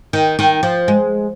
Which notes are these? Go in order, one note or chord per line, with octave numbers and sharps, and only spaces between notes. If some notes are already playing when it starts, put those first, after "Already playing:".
D#3
D#3
F3
G#3